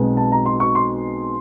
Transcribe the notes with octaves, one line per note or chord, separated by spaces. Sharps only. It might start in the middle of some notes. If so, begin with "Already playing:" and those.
Already playing: B1 B2 G#3 C4
A5
A#5
C6
C#6
C6